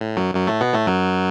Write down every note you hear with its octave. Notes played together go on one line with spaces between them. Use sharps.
A2
F#2 F#3
F#2 F#3
A2 A3
B2 B3
A2 A3
F#2 F#3